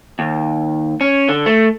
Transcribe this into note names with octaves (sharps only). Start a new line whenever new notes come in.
D#2
C#4
D3
A3